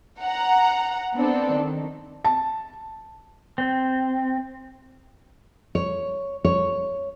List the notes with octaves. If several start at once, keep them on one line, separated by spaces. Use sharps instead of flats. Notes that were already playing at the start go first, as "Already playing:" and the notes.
F#5 A#5
B3 C4 D4 A4
D#3
A5
C4
C#5
C#5